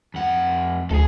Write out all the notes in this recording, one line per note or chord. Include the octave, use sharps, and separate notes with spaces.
F2 F#5
D2 G#4 A4